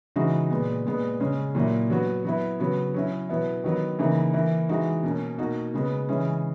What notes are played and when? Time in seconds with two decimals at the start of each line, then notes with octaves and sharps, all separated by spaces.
0.16 C#3 E3 G#3 D#4 F#4
0.50 A#2 G#3 B3
0.86 A#2 G#3 B3
1.20 C#3 G#3 C#4
1.55 A#2 F#3 A#3 E4
1.90 F#3 B3 F#4
2.25 F#3 B3 E4
2.60 C#3 F#3 B3 F#4
2.94 F#3 C#4 E4
3.29 B2 F#3 B3 E4
3.64 D#3 F#3 B3
3.99 C#3 E3 A#3 D#4
4.34 E3 A#3 E4
4.69 E3 G#3 D#4 F#4
5.03 B2 A#3 C#4
5.39 B2 A#3 D#4 F#4
5.74 C#3 G#3 B3
6.09 C#3 E3 G#3 C#4